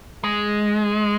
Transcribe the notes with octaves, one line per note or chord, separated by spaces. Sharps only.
G#3